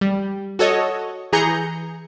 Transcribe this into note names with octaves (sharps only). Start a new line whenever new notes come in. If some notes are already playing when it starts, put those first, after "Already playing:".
G3
F#4 A4 C#5 D#5
E3 G#4 A#5 G6 C#7